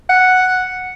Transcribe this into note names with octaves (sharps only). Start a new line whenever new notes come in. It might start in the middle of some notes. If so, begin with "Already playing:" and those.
F#5